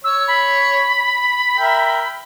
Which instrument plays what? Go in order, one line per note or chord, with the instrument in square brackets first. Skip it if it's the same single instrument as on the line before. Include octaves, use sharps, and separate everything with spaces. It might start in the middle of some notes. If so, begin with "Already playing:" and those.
[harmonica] C#5 [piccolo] E6
[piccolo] B5
[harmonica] A#4 E5 G5